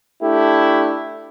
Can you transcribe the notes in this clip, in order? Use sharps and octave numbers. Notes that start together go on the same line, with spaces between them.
A3 D4 E4 G4